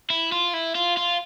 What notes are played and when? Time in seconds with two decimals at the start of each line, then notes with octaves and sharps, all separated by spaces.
0.10 E4
0.32 F4
0.54 E4
0.75 F4
0.97 F4